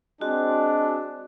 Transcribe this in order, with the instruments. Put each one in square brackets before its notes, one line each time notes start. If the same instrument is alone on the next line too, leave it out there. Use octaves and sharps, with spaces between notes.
[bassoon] G#3 [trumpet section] C4 D4 [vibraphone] F#4